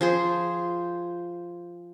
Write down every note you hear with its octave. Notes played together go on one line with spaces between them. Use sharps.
F3 G#4 C5